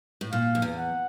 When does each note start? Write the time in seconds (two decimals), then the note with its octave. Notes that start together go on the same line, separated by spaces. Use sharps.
0.21 A2
0.32 A#2 F5
0.55 F2
0.62 E2
0.78 F#5